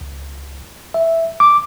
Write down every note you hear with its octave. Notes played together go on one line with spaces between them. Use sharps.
C#2
E5
D6